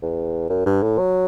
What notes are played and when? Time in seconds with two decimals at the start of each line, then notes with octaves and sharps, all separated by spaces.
0.02 E2
0.49 F#2
0.66 G2
0.83 A2
0.98 F#3